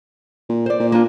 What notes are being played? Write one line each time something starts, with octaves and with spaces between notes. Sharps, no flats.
A#2
C5 D5
A#2
A#3 D4 F4